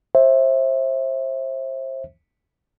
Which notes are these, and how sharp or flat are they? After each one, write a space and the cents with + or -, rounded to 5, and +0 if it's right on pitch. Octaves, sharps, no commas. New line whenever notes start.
C5 +30 E5 -5